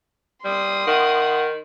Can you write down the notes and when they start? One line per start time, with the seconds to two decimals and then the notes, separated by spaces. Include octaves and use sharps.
0.45 G3 C6 D#6
0.87 D#3 F#5